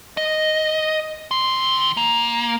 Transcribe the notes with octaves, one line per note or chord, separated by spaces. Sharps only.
D#5
D#3 C6
A#3